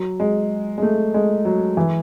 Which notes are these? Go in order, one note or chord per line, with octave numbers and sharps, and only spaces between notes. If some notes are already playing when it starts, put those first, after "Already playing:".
Already playing: F#3
G#3
G#3
A3
G#3
F#3
E3